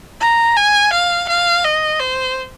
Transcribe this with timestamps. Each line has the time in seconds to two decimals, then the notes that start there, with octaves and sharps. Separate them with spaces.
0.21 A#5
0.57 G#5
0.93 F5
1.29 F5
1.64 D#5
2.00 C5